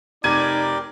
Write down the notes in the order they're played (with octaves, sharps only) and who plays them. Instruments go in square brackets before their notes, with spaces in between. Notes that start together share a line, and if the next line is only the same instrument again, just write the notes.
[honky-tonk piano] F1 G#6 D#7 [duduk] D#4 [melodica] G4 A#4 [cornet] D5